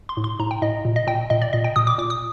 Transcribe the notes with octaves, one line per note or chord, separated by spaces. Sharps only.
C6
A2
C6
A2 A#5
G5
A2 D#5
A#2
D#5
A#2 G5
A#2 D#5
D5
A#2 D#5
G5
A#2 D#6
D6
A#2 D6
D#6